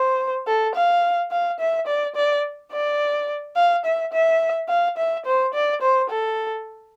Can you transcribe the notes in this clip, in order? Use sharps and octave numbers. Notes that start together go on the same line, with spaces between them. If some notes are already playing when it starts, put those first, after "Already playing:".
Already playing: C5
A4
F5
F5
E5
D5
D5
D5
F5
E5
E5
F5
E5
C5
D5
C5
A4